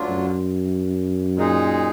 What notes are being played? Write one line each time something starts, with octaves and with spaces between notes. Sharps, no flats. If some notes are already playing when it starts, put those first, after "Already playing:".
Already playing: D2 D3 F#3 D4 F4
F#2
A#2 G#3 D#4 G#4